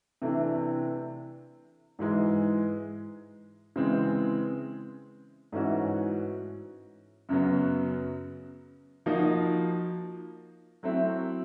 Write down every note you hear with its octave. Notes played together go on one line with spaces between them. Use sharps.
C3 E3 A3 D4
G#2 E3 G#3
C#3 E3 G#3 C4
G#2 E3 A3 C#4 F#4
F#2 C#3 F#3 B3
F3 A#3 D#4 F#4
F#3 A3 C4 E4